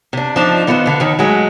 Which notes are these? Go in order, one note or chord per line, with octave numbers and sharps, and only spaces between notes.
C3 D4
F3 D4 D#4
D#3 B3 F4 B4 C5
D3 B4
D#2 D#3
F#3 G#3 A3